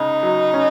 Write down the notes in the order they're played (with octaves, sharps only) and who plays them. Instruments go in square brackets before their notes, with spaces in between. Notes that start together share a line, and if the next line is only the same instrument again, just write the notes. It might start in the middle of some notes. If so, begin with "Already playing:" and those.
Already playing: [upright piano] C#2 C#3 [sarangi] D#4
[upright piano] F#3
C#4